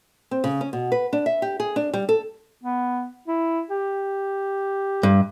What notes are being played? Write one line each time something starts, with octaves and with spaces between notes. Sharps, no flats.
C4
C#3
C#4
B2
B4
D4
E5
G4
G#4
D4
G3
A4
B3
E4
G4
G2